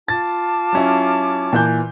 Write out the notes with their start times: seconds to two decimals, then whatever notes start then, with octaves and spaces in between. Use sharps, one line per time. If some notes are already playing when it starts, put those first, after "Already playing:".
0.08 F4 A5 D6 A6
0.73 F#3 C#4 E4
1.53 A#2 E3 G6